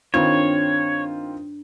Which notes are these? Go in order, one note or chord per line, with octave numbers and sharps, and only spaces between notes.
G2 D#3 C4 F4 C#5